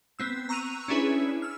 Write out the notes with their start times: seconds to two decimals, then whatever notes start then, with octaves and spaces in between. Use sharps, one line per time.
0.19 B3 C4 E6
0.49 A#5 C#6 E6 F#6 D#7 F7
0.88 C#4 D4 E4 G#4 B4
1.42 E6 F6